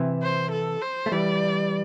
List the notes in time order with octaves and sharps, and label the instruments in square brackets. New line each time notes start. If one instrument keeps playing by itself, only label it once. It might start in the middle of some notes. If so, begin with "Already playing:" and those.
Already playing: [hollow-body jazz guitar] C3 E3
[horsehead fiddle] C5
A4
C5
[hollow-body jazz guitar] A3
[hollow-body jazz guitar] E3 G3 [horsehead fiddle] D5